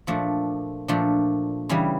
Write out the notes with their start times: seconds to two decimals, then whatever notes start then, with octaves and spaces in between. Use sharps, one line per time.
0.07 A#2 F3 A3 D4
0.88 A#2 F3 A3 D4
1.69 C#3 E3 G3